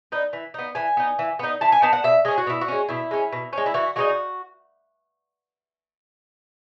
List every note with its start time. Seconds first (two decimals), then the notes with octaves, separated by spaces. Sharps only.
0.12 B3 D#4
0.33 E3
0.54 B3 D#4
0.75 E3 G#5
0.97 B3 D#4
1.19 E3
1.39 B3 D#4
1.61 E3 A5
1.72 G#5
1.82 B3 D#4 A5
1.93 F#5
2.04 B2 E5
2.25 G#3 C#4 G#4
2.38 F#4
2.47 B2 E4
2.61 F#4
2.68 G#3 C#4
2.89 B2 E4
3.11 G#3 C#4
3.32 B2
3.53 G#3 C#4
3.66 E4
3.74 E3 F#4
3.96 G#3 B3 D#4 F#4